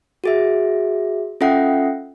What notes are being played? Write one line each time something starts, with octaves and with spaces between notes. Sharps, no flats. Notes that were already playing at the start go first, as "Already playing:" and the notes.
F#4 G#4 E5
C#4 F4 A4 E5 F#5 G5